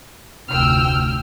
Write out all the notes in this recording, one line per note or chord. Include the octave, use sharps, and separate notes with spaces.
F1 D2 G5 E6 F6